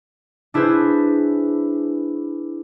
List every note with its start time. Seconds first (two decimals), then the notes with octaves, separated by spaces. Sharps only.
0.54 D4 E4 G#4 B4 C5